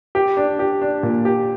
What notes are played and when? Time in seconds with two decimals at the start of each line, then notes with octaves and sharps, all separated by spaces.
0.15 G4
0.37 D4
0.59 G4
0.81 D4
1.03 A#2
1.25 G4